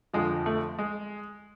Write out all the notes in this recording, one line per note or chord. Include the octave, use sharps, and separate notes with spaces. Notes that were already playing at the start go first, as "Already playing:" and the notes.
F2 D3 F3 G#3
A3
G#3